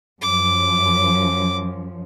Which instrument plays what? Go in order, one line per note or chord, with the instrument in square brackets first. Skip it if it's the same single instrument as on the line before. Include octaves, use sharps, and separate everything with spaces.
[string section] F#2 F3 [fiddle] D6